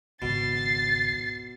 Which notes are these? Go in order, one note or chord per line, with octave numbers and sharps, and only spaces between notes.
G#1 C#2 B2 A6 C7